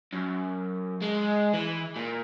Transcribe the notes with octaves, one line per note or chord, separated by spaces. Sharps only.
F#2
G#3
E3
A#2